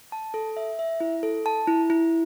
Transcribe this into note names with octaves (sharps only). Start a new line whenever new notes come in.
A5
A4
E5
E5
E4
A4
A5
E4
E4